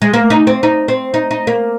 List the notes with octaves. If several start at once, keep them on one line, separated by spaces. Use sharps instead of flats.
G#3
A#3
D#4
C4
D#4
C4
D#4
D#4
A#3